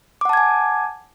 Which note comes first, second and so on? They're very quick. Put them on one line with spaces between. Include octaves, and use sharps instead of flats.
D6 F#5 A5 G#6 G#5